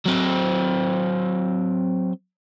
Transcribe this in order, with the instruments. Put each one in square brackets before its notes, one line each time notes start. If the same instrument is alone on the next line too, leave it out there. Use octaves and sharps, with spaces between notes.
[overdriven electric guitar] F#3 C4